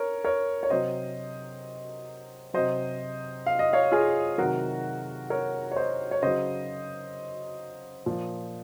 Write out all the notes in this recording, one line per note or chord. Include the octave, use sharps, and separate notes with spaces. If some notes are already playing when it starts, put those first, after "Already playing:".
Already playing: A#4 C#5
A#4 C#5
C#5
C3 F#3 C5 D#5
C3 F#3 C5 D#5
F5
D#5
C#5 F5
F4 G#4
C3 D#3 F#3 F#4 A#4
A#4 C#5
C#5
C5 D#5
C#5
C#3 F#3 C5 D#5
A#2 F3